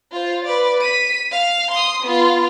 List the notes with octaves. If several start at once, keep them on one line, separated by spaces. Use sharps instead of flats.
F4 C5
B4 D5
B6 D#7
F5
C6 D#6
B3 F4